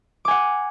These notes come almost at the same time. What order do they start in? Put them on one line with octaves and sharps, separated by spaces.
D6 G#5 F#5